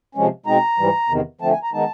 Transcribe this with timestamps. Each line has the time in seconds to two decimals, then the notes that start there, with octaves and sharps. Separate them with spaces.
0.15 C3 F3 G#3 C#4
0.46 B2 G#3 C4 D#4 A#5
0.78 G#2 E3 G3
1.09 E2 C3 D#3
1.41 D3 F3 A3 C4 A5
1.51 G#5
1.63 A#5
1.73 D#3 G#3 B3 D#4 A5